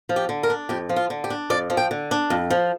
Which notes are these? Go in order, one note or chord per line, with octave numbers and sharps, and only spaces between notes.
F3
G4
D3
A#4
D4
F2 G4
F3
F4
D3
G4
D4
F2 D5
F3
G5
D3
D4
F2
F3